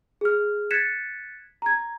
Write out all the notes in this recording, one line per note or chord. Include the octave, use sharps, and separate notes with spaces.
G#4 F6
F#6 G#6 A6 B6 C#7 E7
A#5 G#6